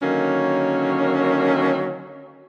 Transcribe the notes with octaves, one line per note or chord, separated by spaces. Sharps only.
D3 D#3 F#3 A#3 C#4